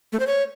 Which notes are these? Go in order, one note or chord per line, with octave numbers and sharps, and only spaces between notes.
A3
C5
C#5